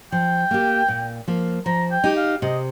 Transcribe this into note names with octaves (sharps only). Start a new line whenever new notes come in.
F3 G5
A#3 G4
A#2
F3 A#3
F3 A#5
G5
D#4 G4
F5
C3 D#5